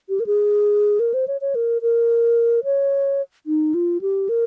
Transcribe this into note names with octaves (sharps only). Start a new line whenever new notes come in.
G4
A#4
G#4
A#4
C5
C#5
C#5
A#4
A#4
C#5
D#4
F4
G4
A#4